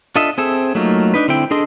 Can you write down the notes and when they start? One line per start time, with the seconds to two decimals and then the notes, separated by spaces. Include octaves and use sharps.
0.16 D4 F4 A4 D#5 E5
0.38 C4 G#4 A4 E5
0.75 F#3 A3 A#3 D#4 F4
1.14 D4 D#4 B4
1.28 D3 C4 E4 G5
1.51 D4 G#4 A4 D#5 C6